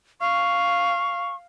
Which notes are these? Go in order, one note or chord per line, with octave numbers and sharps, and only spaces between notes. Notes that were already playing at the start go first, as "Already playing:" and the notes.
F5 C#6